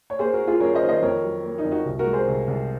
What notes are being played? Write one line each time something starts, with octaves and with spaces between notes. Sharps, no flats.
C#5
A#3 G#4 C5
F#4 A#4
A#3
F4 G#4
F#2 A#4 C#5
C5 D#5
D#3
C5 D#5
F2 A#4 C#5
F#3
A#3
D#4
F2
D#4 F#4
C2
F#4 A#4
G#3
G#4 C5
C2
C2